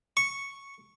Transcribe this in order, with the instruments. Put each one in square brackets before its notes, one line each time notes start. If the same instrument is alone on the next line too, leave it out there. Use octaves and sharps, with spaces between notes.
[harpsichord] C#6